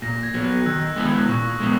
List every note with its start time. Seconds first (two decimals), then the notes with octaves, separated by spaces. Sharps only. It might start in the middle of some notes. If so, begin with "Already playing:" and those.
0.02 A#2 A#6
0.23 G#6
0.34 F#3 B3
0.45 F#6
0.66 D#3 E6
0.96 G#3 B3 E4 B4 E6
1.28 A#2 C#6
1.49 D#6
1.60 G#3 B3